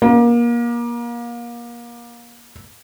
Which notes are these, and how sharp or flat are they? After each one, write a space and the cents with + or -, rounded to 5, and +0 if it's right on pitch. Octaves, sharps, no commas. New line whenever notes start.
A#3 +30